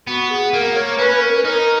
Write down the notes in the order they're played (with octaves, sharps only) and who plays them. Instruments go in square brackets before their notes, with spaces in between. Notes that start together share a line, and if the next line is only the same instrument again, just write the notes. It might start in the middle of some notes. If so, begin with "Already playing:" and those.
[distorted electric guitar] B3 [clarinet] F#4
[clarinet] G#4
[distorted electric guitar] A#3 [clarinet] A#4
[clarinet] C#5
[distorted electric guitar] C#4 [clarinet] B4
[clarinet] A#4
B4
[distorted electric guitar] D#4 [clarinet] A#4